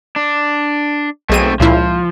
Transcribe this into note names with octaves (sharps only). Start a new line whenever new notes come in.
D4
B1 A3 C4 G#4 D#7
C#2 A#2 F3 E4